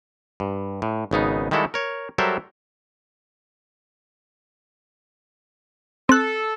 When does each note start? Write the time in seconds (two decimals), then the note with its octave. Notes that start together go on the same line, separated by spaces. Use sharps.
0.40 G2
0.82 A2
1.11 G#1 C#3 B3 D#4
1.51 D#3 G3 G#3 E4 F#4 A4
1.74 A#4 C#5
2.18 F#3 G3 A4 A#4 C5 E5
6.09 C4 A4 F#6